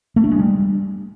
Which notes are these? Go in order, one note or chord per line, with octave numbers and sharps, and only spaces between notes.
A3
D4
G#3
G3